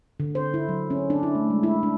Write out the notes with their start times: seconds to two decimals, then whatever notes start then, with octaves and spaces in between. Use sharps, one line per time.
0.20 D3
0.35 C5
0.54 E4
0.69 F#3
0.90 C#4
1.10 D4
1.23 E4
1.35 A3
1.50 G#3
1.63 E4
1.83 D4